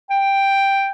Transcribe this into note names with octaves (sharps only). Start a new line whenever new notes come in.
G5